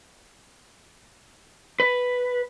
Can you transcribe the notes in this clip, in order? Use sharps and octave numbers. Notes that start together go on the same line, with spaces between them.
B4